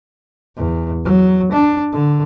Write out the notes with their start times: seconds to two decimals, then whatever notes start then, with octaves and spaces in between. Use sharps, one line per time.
0.57 E2
1.05 F#3
1.52 D4
1.93 D3